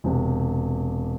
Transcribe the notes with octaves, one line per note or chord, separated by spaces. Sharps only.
E1 C3